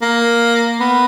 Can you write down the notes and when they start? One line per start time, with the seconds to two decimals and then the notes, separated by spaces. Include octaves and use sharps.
0.02 A#3
0.80 B3